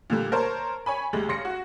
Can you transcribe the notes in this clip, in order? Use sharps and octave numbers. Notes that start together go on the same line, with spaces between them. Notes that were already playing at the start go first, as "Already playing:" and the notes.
A#2 D3 G3
A#4 C5 C#5 A5
C#5 G#5 B5
D2 G3 G#3
C#3 C6 A#6 C#7
F#4